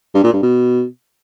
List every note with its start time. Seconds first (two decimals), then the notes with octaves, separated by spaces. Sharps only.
0.14 G2
0.24 A#2
0.33 G2
0.42 B2